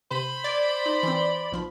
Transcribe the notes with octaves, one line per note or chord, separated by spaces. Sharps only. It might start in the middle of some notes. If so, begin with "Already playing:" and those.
C3 C5 B5 D#7
D5 G#6
D#4
E3 C4
B1 F3 B5